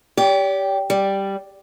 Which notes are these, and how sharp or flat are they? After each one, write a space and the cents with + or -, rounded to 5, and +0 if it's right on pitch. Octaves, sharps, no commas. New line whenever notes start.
G4 +0 D5 -45
G3 +0 D5 +0